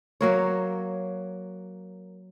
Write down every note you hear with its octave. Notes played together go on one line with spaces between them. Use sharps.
F#3 A#3 C#5